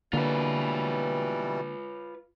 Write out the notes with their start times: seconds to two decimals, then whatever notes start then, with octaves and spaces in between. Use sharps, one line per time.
0.13 B2 D3 E3 G3 A#3 F4 B4